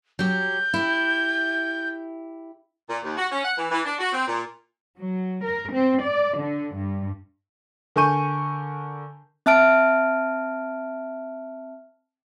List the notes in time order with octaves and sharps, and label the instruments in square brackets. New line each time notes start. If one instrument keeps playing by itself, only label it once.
[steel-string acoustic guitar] F#3 G4 [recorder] G6
[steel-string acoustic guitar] E4 G4
[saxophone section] A#2
D#2
F#4
C#4
F#5
E3
E3
D4
F#4
C4
A#2
[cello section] F#3
A#4
C4
D5
D3
G2
[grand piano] D3 A#4 G#5 C#6 G6 D#7
[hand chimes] C4 E5 A5 F6 D7